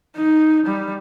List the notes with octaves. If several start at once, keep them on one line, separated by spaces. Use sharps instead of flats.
D#4
G3